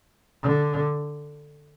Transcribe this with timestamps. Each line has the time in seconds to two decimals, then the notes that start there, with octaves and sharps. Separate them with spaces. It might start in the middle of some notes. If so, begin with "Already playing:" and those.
0.43 D3